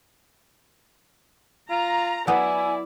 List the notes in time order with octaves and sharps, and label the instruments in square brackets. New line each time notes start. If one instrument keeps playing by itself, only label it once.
[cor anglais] F4 [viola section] A#5
[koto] F#3 B3 [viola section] E4 [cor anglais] D5 [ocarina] G#5